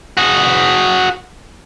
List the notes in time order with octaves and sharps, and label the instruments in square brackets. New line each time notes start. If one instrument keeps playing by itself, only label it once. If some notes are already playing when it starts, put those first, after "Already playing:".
[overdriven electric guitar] F#4 G#4